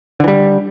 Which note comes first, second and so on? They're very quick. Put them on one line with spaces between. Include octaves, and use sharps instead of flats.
D3 E3 G3